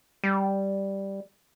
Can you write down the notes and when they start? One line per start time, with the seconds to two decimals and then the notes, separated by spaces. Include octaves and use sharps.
0.24 G3